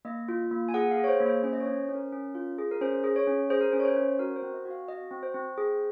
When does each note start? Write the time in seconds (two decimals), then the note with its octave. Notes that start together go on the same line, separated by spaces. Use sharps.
0.05 A#3 D#5
0.28 F4
0.51 A#3
0.69 G#5
0.74 G#4 F#5
0.91 F5
0.97 G#4
1.04 C#5
1.08 C5
1.20 A#3
1.26 C5
1.43 C#4 C5
1.53 D#5
1.60 C#5
1.66 C#4
1.78 C5
1.89 C#4
1.95 A#4
2.12 C#4
2.35 F4
2.58 G#4
2.71 A#4
2.81 C#4 C5
3.04 G#4
3.16 C#5
3.27 C#4
3.50 G#4 C5
3.61 A#4
3.72 C#4 C5
3.80 C#5
3.85 C5
3.97 C#4
4.19 F#4 A#4
4.36 C5
4.42 C4
4.54 D#5
4.65 F#4
4.71 F5
4.88 F#4 D#5
5.11 C4
5.23 C5
5.34 C4
5.58 G#4